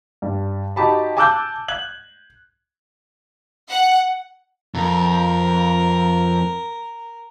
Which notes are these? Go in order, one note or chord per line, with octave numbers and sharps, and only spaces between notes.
G2
D#4 F#4 G4 A5 B5
G#5 A5 D6 E6 F#6 G6
F#6 G#6 F#7
F#5
F2 A#4